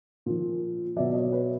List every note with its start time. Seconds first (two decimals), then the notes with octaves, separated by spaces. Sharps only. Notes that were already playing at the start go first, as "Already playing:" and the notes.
0.26 A#2 F3
0.96 B2 F#3 D5 E5
1.10 E5
1.14 C#5 D#5
1.32 B4 C#5